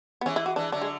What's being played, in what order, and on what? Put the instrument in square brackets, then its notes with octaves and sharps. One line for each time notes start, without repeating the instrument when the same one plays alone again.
[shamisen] B3
[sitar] E3 G#3 [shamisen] C#4
[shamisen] E4
F#4
[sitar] E3 G#3 [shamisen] D4
[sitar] D3 F#3 [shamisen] D4
[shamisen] G#3